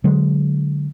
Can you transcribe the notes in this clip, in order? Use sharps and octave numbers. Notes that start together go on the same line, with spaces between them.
D3 F#3 G#3